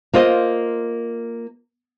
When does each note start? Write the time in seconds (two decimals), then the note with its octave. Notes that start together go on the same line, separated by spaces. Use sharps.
0.13 A#3 F4 C5 D#5